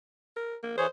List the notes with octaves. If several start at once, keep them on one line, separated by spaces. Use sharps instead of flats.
A#4
A#3
E3 G#4 C5 C#5